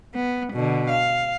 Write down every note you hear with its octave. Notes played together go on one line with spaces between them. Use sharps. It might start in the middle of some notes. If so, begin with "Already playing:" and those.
B3
B2 D3
F5